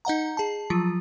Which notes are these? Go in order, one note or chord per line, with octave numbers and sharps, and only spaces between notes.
D#4 D#5 F#5 A#5
G#4 A5
F3 F#3 F4